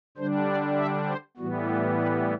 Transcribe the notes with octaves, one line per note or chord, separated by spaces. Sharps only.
D3 G3 D4 C5
D5
E5
C5
A2 E3 G3 B3 F#4
A4
B4